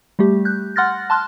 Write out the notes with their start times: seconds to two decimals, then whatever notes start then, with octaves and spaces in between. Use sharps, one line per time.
0.19 G3 A3 G4
0.45 F#6 G6
0.76 F#5 C6 F6 F#6 A6 A#6
1.10 A5 C6 F6 F#6